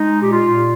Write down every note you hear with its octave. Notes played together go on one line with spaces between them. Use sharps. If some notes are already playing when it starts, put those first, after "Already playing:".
Already playing: G#3 D#4
A#2 G4
F4
A#2